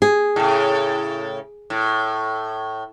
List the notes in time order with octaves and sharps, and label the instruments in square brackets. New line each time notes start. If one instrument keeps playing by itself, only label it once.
[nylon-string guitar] G#4
[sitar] A2 C#3
A2